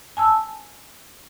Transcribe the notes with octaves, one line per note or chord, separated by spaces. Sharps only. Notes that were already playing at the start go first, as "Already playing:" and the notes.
G#5 A5 E6